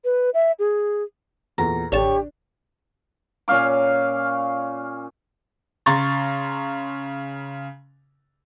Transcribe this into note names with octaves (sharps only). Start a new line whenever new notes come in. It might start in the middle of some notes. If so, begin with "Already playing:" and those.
B4
E5
G#4
E2 A#2 A4 A#5
A1 D3 D4 G4 C#5 A5
A#2 C#4 F5 D6
C#3 A#5 C6 C#6 A6